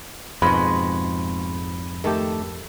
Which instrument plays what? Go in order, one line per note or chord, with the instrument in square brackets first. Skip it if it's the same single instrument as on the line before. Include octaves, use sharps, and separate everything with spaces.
[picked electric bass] F2 G#2 [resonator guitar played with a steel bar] B2 G#3 [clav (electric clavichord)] B4 [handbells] B5
[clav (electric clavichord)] D#3 A3 G4 [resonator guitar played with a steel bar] A4